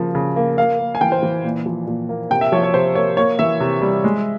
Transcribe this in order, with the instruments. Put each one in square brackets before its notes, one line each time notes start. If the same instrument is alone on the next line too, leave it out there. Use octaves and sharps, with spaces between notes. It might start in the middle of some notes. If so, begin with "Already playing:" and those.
Already playing: [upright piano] C#3 F3 A#3
C#3
A#3
A#3 F5
A#3
G#5
E3 G5
C5
E3
A#2
F3
A#2
A#3
C3 G5
E5
F3 C#5
C#5
C3 C5
A#3 C#5
A#3 C#5
E3 E5
C3
G3
G#3